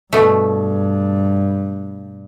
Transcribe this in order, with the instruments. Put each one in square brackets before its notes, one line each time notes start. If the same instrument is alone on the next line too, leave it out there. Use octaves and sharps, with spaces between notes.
[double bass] G2 [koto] B2 A3